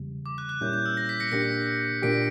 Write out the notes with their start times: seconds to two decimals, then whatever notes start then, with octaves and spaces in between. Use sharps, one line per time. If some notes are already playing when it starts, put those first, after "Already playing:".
Already playing: E2 C#3 G3
0.26 D6
0.38 F#6
0.49 F#6
0.61 A#2 G3 A#3 C#4 E4 G6
0.73 G6
0.86 E6
0.97 A#6
1.09 B6
1.20 A#6 C#7
1.31 A#2 A#3 D4 G4 A#6 C#7
2.02 A#2 A#3 D4 G4 B6 D7